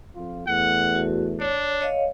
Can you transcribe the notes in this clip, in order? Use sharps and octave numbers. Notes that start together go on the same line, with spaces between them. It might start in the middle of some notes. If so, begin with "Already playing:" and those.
F2 F4
E2 A3 F#5
F#4
D4 C#5
C#5 D#5 F5